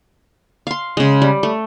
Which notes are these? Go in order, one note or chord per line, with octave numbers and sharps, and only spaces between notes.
F5 C6
C#3 G#3
G3
A3